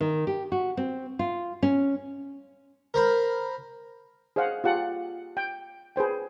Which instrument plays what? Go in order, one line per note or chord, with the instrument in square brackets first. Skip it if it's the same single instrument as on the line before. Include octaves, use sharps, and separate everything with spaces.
[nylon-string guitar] D#3
G4
F#4
C4
F4
C#4
[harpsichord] A#4 C5 B5
[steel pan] G#4 C5 D#5 F5 F#5
F4 G4 F#5 A5
G5
G#4 B4 C5 G5